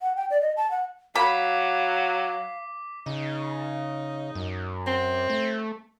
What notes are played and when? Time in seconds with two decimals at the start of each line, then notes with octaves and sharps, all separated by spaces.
0.01 F#5
0.16 G5
0.30 D5
0.42 D#5
0.57 A5
0.71 F#5
1.16 F#3 F5 B5 D6 B6
3.06 C#3 D#4
4.35 F#2
4.87 C4
5.30 A3